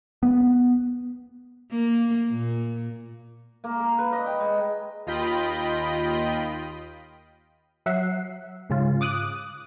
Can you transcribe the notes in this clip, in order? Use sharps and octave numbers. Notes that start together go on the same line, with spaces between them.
B3
A#3
A#2
A#3
A#4
B4
D#5
G5
G#3
D#2 F4 D#5 G5 B5
F#3 E5 F#5 C7
G#2 C#3 F4
D6 D#6 F#6